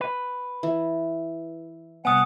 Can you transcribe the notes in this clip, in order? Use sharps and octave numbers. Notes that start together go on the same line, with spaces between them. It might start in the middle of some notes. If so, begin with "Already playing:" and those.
B4
E3
C2 B3 F#5 G#5 D#6